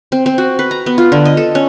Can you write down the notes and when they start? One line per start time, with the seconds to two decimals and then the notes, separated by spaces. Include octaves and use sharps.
0.12 C4
0.26 C4
0.38 F#4
0.59 B4
0.71 A#5
0.86 B3
0.98 F4
1.12 D3
1.25 D#5
1.37 A4
1.55 C#4